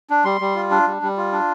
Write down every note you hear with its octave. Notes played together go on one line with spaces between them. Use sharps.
D4
G3 C6
G3
F4
D4
G3
G3
F4
D4